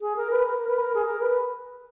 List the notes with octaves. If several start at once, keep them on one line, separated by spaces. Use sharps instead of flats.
G#4
A#4
B4
A#4
A#4
B4
A#4
G#4
A#4
B4